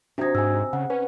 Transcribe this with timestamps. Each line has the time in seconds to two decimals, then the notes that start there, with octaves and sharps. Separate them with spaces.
0.18 C3 D4 D#4 F#4 G#6
0.35 G#2 G#5 E6
0.73 C#3 F#5
0.90 C#4 B4